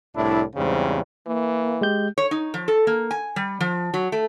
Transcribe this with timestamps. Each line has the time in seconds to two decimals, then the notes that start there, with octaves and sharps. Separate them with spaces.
0.15 C2 A2 D4 E4
0.55 E2 G#2 C#3 G3 C4
1.27 E3 A#3
1.81 G#3 G4 G6
2.18 C#5
2.31 D#4
2.54 F3
2.68 A4
2.87 A#3
3.11 G#5
3.36 G3
3.60 F3
3.94 F#3
4.12 A3